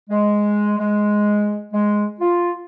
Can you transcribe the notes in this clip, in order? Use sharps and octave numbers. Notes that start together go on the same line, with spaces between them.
G#3
G#3
G#3
F4